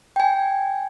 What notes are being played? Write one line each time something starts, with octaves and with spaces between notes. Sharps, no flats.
G5 G#5